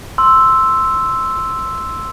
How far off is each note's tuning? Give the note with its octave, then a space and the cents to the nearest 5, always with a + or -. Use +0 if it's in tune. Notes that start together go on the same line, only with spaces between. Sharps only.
C6 +0 E6 +0